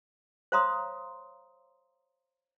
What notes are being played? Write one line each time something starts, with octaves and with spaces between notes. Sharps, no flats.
C5 C#5 F5 A#5 C6 D#6